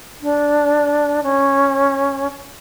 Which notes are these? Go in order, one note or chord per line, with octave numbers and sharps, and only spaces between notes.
D4
C#4